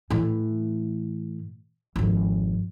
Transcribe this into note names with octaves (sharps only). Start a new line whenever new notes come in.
A2 E3
G#1 F2